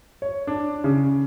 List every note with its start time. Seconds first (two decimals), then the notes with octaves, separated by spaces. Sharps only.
0.22 C#5
0.47 D4
0.84 C#3